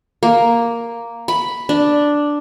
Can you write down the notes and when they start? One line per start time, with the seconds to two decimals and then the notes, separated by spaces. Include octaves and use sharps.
0.23 A#3
1.28 B5
1.69 D4